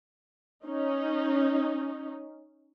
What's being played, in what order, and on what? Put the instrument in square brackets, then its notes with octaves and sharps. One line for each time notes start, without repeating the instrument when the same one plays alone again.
[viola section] C#4 D#4